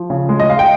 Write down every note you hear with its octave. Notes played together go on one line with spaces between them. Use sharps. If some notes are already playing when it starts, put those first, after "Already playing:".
Already playing: F3
C#3
G#3
D#5
G#3 F5
G5